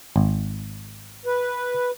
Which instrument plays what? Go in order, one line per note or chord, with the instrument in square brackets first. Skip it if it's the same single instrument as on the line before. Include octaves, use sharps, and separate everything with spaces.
[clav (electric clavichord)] G#1
[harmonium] B4